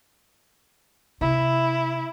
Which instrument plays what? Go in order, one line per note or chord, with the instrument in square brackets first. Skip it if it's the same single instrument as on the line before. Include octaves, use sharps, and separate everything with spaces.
[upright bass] C3 [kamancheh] E4